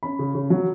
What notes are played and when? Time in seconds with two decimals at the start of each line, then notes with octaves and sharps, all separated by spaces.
0.03 C#4 B5
0.19 C#3
0.35 C#3
0.50 F#3